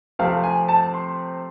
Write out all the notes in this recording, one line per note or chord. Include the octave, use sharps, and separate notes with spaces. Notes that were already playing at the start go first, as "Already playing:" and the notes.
C3 F3 A3 C4 F5
G#5
A5
C6